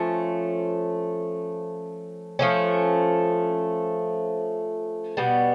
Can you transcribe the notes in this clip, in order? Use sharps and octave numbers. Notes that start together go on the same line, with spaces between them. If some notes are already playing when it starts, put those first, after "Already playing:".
Already playing: F3 A3 C#4
F3 A3 C#4
B2 G3 B3